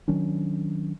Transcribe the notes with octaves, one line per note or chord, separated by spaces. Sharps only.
D#3 F#3 C#4 D4